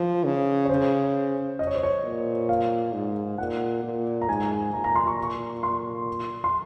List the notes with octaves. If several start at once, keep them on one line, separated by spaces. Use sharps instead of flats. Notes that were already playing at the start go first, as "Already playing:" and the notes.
Already playing: F3
C#3
C#5
C#3 C5
D#5
C#5
C5
C#5
A#2
F5
G#2
A#2 F#5
A#2
A#5
G#2 G#5
G#5
A#2 A#5
A#5
C6
C#6
C#6
C6
C6